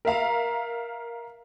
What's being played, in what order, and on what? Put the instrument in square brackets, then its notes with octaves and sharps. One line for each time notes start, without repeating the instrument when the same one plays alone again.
[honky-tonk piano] A#4 E5 F5 A#5